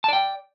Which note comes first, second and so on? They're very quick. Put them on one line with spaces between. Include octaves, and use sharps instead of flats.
A5 D5 G5